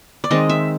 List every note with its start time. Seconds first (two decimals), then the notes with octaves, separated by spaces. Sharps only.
0.24 D5
0.31 D#3 G#3 C4 D#5
0.49 E5